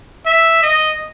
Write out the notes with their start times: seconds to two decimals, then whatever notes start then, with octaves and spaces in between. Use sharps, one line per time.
0.26 E5
0.63 D#5